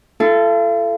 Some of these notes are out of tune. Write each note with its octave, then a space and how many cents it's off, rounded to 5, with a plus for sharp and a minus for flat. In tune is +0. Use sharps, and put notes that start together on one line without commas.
F4 -45 A4 +0